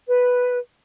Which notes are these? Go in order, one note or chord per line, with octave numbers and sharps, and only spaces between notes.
B4